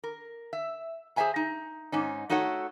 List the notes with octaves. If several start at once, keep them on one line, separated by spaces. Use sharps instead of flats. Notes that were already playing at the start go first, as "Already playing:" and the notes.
A#4
E5
G#4 C5 C#5 E5 G#5 A#5
D#4
G#2 C#4 D#4
A3 D#4 F#4 A4 C#5 F#5